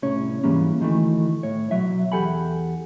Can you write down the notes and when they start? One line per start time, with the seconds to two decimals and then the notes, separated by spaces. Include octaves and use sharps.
0.02 C2 A2 C#4 C#5
0.44 G#2 E3 G3 A#3 C#4
0.80 D2 D#3 E3 A3
1.43 A2 C#5
1.71 B2 F#3 E5
2.12 E2 G4 A4 F#5 G#5 B5